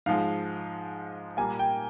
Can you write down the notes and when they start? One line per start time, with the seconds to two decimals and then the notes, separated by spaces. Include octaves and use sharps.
0.06 G#2 F3 G#3 F5
1.37 A#2 G3 A#3 G#5
1.59 G5